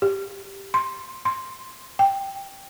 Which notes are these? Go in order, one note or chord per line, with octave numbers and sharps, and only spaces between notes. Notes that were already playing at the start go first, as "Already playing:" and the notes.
G4
C6
C6
G5